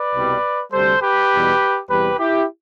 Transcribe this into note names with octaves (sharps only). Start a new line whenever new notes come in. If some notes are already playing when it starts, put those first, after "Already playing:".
Already playing: B4 D5
C2 B2 G3
D2 C3 G3 A4 C5
G4 B4
E2 B2 G3
E2 C3 G3 G4 B4
E4 G4